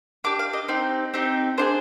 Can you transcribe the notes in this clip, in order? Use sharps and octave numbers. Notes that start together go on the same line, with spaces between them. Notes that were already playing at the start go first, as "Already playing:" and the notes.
D4 G4 D6
F5
D#5
C4 D#4 G4
C4 D#4 G4
D4 F4 G#4 C5